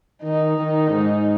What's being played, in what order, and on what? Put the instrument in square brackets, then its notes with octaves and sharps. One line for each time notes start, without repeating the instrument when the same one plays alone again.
[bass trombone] D#3 [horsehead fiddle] D#4
[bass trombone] D#3
G#2